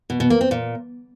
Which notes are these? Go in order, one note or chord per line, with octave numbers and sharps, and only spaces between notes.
B2
B2
A#3
C4
A#2